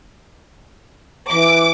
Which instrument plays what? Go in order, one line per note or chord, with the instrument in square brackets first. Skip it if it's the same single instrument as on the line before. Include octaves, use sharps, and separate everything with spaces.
[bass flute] E3 [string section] D6